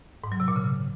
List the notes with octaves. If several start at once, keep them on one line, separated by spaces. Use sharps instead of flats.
G#2
F#3
C3
A#2
C#3